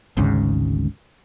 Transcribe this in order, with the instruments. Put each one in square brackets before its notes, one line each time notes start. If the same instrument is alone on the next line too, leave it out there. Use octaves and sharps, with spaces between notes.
[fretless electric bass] G#1 D2 G#2 C#3